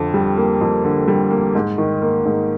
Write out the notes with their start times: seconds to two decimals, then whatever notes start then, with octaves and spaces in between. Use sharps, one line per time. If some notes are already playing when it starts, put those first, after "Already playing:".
Already playing: F2 D3
0.14 G3
0.37 A#3
0.61 F2
0.84 D3
1.08 G3
1.31 A#3
1.55 G#2
1.78 D#3
2.02 A#3
2.25 G#2